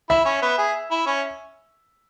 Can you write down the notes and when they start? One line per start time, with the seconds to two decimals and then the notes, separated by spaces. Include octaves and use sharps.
0.10 E4 E5
0.25 C#4
0.42 B3
0.58 G#4
0.91 E4
1.06 C#4